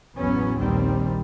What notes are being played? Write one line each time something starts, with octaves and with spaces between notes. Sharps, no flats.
A1 E2 F#3 B3 C#4
A#1 D#2 D#3 G3 C4